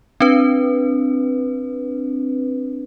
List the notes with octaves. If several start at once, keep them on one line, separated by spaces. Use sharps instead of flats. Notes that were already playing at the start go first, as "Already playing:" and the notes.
C4 D4 B4